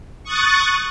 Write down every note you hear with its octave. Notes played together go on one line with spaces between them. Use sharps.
C#6 D#6 F#6 A6